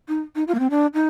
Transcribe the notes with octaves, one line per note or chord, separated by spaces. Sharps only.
D#4
D#4
F4
A#3
C4
D4
D#4